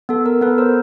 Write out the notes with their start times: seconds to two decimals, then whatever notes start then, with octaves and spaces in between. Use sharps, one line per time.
0.09 B3 A4
0.26 A#4
0.41 B3 A4 B4
0.58 A#4 C5